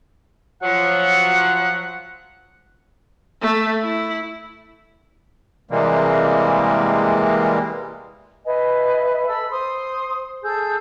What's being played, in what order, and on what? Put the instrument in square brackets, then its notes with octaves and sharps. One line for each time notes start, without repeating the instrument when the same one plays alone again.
[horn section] F3 F#3 [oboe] F#5
[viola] A3
E4
[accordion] C3 E3 G3 G#3 A#3 C4
[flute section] B4 D#5 E5 G#5
A4 B5 E6
C5 C6 D#6
G#4 A4 E6 G6